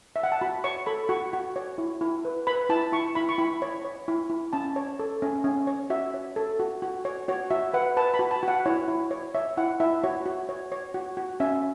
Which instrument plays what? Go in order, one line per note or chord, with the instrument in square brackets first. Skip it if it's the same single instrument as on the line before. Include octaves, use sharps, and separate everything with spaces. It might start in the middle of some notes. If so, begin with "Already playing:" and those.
[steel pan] E5
F#5
A5
F#4 B5
C#5 C#6
A4 B5
F#4 C#6
F#4
C#5
E4
E4
B4
B4 B5
E4 A5
E4 C#6
E4 B5
C#6
E4 B5
C#5
C#5
E4
E4
C#4 A5
C#5
A4
C#4
C#4
C#5
F#4 E5
C#5
A4
F#4
F#4
C#5
F#4 C#5
F#4 E5
B4 F#5
B4 A5
B5
F#4
A5
F#4 F#5
E4 C#5
E4
C#5
C#5 E5
E4 F#5
E4 E5
F#4 C#5
F#4
C#5
C#5
F#4
F#4
C#4 E5